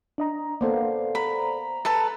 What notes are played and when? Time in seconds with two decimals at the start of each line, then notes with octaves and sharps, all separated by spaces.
0.18 D4 D#5 A#5
0.61 A#3 B3 A4 C5 D5 F5
1.15 A#5 B5
1.85 A4 B4 A5